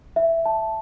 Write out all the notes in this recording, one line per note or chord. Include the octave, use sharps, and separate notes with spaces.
E5
A5